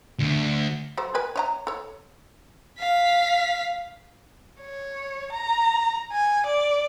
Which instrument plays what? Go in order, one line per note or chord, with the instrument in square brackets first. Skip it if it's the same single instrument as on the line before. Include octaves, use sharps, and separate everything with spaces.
[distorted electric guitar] D2
[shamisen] F#3 A4 C5
A#4 B4 G#5
C#5 D#5 A#5
A4 C#5
[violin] F5 B6
[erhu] C#5
A#5
G#5
D5